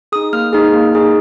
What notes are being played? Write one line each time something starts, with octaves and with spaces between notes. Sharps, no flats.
D#4 G#4 D#6
A#3 F6
D#4 G#4
A#3
D#4 G#4